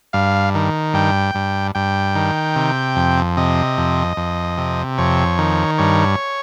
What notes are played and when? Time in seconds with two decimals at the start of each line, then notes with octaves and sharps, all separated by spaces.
0.13 G2 F5
0.55 D#3
0.94 G2 G5
1.35 G2
1.75 G2 G5
2.15 D#3
2.56 C3
2.96 F2
3.37 C3 D#5
3.78 F2
4.17 F2
4.58 C3
4.98 F2 C#5
5.38 D#3
5.78 G2 C#5